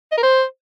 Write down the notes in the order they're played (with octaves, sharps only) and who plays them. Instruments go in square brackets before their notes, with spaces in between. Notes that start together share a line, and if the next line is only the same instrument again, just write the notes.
[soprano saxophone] D#5
A#4
C5